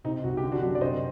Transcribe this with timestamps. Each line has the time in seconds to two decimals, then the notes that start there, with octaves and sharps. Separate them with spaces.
0.04 C3 D#4
0.24 C2 F#4
0.37 G4
0.43 D3
0.52 D4 F#4
0.62 F#2
0.75 D5
0.81 C3 C5 D#5